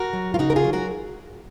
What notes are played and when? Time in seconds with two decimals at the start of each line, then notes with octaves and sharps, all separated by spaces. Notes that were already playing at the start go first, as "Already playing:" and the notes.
Already playing: F#4 A#4
0.13 F#3
0.34 F4
0.39 C#3 D#4 F#4
0.50 A#4
0.56 F4 G#4
0.64 F#3
0.73 F#4 A#4